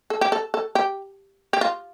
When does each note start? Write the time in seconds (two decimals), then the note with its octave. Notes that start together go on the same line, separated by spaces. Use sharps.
0.10 A4
0.21 G4
0.32 A4
0.54 A4
0.75 G4
1.53 G4
1.61 F4